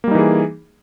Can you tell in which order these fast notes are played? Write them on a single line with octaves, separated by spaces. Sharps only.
A#3 G3 D#4 E3 G#4